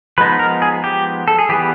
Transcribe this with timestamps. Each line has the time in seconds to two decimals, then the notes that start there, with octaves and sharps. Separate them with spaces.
0.18 F3 G#3 B3 D#4 B4
0.39 A#4
0.62 G#4
0.84 G4
1.28 A4
1.39 G#4
1.49 E3 G3 B3 G4